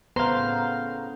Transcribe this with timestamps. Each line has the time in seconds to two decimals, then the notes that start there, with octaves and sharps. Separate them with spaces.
0.16 A2 C#3 B3 B4 C5 F5 A#5 C6